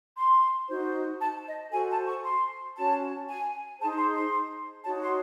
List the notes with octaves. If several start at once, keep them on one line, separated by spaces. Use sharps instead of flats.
C6
D#4 F#4 C5
A5
D#5
F#4 A4 C5 G#5
A5
C#6
C6
C#4 F#4 C#5 A5
G#5
D#4 G#4 C5 A5
C6
C6
D#4 F#4 C#5 A5
C6